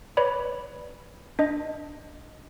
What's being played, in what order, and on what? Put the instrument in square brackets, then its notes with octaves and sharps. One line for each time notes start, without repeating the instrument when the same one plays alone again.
[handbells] B4 C#5 D5 B5
D4 D#5